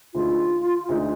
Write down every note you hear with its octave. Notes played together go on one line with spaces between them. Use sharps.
D2 D3 G#3 D#4 F4
D2 D3 G#3 D#4